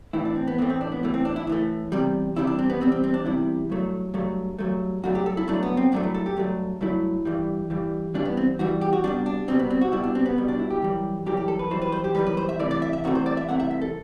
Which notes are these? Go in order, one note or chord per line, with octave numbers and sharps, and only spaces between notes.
A2 E3 A3 E4
D4
C4
B3
A2 E3 A3 C4
C4
D4
B3
A2 E3 A3
C4
D4
E4
A2 E3 A3
E2 C3 G3
E2 C3 G3 E4
D4
C4
B3
E2 C3 G3 C4
C4
C4
D4
E2 C3 G3 E4
G2 F#3 A3
G2 F#3 A3
G2 F#3 A3
G2 F#3 A3 F#4
G4
A4
E4
G2 F#3 A3 D4
B3
C4
G2 F#3 A3 D4
E4
A4
G4
G2 F#3 A3
G2 F#3 A3 E4
G2 E3 G3
G2 E3 G3
G2 E3 G3 D4
B3
C4
G2 E3 G3 F#4
G4
F#4
C2 B2 G3 D4
D4
C2 B2 G3 C4
B3
C4
F#4
C2 B2 G3 E4
D4
C4
B3
C2 B2 G3
D4
E4
G4
F#2 E3 G3
F#2 E3 G3 G4
G4
A4
B4
F#2 E3 G3 C5
B4
C5
G4
F#2 E3 G3 B4
B4
C5
E5
C2 C3 E3 A3 D5
D5
E5
E5
C2 C3 E3 A3 F#4
C5
D5
E5
C2 C3 E3 A3 F#5
E5
E5
A4